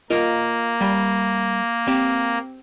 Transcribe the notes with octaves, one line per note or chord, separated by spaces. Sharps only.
A#3 F4 A#4 D#5
G3
C4 G4